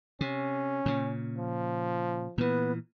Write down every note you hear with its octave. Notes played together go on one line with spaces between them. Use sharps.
C3 C#4
A#2 C#3
F3
A#2 E3 B3